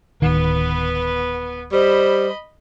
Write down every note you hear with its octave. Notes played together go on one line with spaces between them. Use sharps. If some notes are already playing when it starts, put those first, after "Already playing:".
D1 D#3 B3 B4
G3 C5 D#5 B5